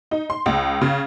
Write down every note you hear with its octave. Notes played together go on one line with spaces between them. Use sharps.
D#4
C6
C#2
C#3